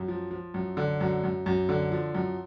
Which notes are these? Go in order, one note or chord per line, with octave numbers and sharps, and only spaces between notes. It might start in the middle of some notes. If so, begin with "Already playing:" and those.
Already playing: F#2
F3
F3
F#2
D3
F#2
F#2
F#2
D3
F3
F#2